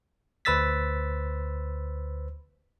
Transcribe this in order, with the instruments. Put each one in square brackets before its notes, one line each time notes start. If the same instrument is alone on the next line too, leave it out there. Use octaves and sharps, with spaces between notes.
[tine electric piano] D2 B4 C5 E6 A6 B6